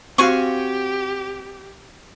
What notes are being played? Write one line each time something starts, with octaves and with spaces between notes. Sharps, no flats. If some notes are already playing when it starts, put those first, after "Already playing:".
C4 F#4 G4 F5 G#5 C#6